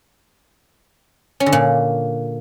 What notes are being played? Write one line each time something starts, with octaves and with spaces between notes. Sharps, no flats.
C#4
D3
A#2